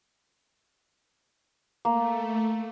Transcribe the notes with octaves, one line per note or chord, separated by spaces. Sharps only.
A3 A#3